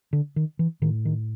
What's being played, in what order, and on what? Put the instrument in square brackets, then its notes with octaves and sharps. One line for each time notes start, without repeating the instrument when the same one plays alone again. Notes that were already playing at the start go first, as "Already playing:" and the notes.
[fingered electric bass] D3
D#3
E3
A2 D#3
D#3